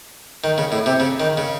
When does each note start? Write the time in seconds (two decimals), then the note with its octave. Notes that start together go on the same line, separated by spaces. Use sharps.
0.44 D#3
0.58 C#3
0.72 A2
0.86 C3
1.00 C#3
1.20 D#3
1.37 C#3